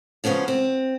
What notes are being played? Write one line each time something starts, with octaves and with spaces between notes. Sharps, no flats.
C#3 F3 B3 C#4 F4
C4